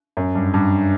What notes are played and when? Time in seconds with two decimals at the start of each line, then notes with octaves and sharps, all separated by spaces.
0.17 F#2
0.35 G2
0.54 G2